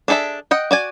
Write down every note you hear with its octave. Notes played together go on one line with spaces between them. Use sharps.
D4 G#4 A4 B4 E5
D#5 F#5 G5
F#4 D5 G#5